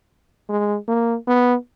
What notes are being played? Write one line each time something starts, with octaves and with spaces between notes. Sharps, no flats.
G#3
A#3
B3